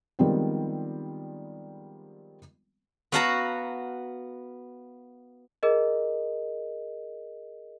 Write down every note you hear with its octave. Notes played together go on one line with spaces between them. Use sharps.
D#3 F3 G3 G#3 B3 C4
B3 F#4 F5 F#5 A5 A#5
G#4 A#4 D#5